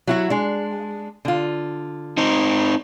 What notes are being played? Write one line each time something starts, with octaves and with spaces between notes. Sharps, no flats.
F#3 E4 F#4
G#3 D4
D3 F4
C4 D#4